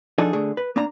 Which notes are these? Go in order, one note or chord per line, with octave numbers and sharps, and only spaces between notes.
F3 D4 D#4 G#4 A4 F#5
D3 A3 G#4
B4
A#3 D4 A#5